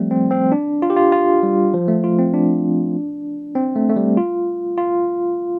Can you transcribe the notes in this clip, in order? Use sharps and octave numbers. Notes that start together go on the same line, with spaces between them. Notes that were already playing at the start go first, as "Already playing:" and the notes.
Already playing: F3 G3 A3 C4
C4
C4
D4
F4
G4
F4
F4
G3
F3
A3
F4
C4
D4
C4
A3
A3
G3
F4
F4